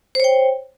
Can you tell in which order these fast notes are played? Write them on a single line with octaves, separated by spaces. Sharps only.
C5 C#5 G5